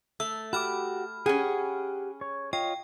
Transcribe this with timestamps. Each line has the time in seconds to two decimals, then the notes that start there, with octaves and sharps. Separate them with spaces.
0.20 A3 E6
0.53 F#4 G4 B5 D6 F6
1.26 C#4 G4 G#4 F#5
2.21 C#5
2.53 F4 C#5 D#5 G5